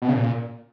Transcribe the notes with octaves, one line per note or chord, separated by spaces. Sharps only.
B2
C#3
A#2